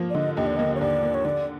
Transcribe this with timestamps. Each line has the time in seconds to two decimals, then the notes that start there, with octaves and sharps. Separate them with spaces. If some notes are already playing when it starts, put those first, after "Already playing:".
Already playing: F3 A#3
0.10 D5
0.15 D3 D#5
0.37 D#2 D#5
0.46 D5
0.57 A#3 D#5
0.75 C#5
0.80 D#2 D5
1.03 A#3
1.14 C#5
1.25 D3 D5